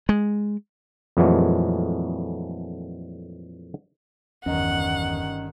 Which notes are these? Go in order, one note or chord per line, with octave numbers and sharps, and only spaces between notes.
G#3
F2 A#2 E3 F#3 G#3 A3
G1 E2 D#3 C#4 D#5 F#5